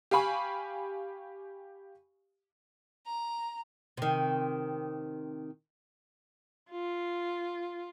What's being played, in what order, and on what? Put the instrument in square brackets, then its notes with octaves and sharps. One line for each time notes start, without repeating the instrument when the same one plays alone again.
[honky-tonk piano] G4 F5 G#5 B5 C#6
[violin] A#5
[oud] C3 D#3
[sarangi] F4